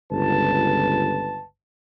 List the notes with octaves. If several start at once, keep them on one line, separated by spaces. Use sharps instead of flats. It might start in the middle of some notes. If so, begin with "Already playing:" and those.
G1 C#2 B4 A5